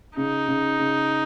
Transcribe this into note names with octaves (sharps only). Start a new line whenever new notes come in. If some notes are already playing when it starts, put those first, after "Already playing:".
C#3 D#4
C#3
C#3